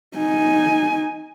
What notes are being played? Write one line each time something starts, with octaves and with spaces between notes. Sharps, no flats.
D#4 G#5